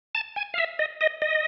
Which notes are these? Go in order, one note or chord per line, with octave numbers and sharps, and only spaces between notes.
A5
G#5
F5
E5
D#5
D#5
D#5